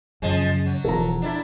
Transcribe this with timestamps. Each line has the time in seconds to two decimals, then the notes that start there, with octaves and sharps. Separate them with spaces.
0.22 F#2 C#3 F3 G#3
0.66 F#3
0.84 E1 E2 F3 A4 A#5
1.22 D4 E4